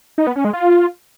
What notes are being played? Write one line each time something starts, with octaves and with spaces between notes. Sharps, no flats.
D#4
B3
C#4
G#3
F4